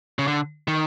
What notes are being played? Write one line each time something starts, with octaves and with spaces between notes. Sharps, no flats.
C#3
D3
D#3